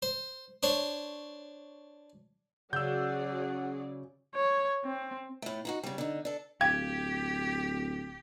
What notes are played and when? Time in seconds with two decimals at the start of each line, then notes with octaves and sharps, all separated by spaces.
0.03 C5
0.63 D4 C5 C#5
2.73 C#3 F#3 G#4 D5 F#5 E6 G6
4.36 C#5
4.85 C4
5.42 A2 A3
5.65 D#4 E4 F#4
5.83 C#3 G3
5.98 D3 D#4
6.25 D4 A4
6.61 D1 G4 F5 G5 G#6